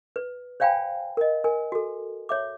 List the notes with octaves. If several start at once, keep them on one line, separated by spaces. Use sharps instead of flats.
B4
C5 D5 F5 G5 G#5 B5
A#4 D#5
A#4 G#5
F#4 A4
C#5 E5 D6